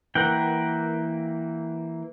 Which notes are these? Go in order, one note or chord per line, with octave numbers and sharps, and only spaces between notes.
E3 A#3 A#4 F#5 G5